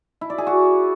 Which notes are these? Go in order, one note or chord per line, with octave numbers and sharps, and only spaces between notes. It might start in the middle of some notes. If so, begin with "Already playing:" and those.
E4
D5
G#4
F#4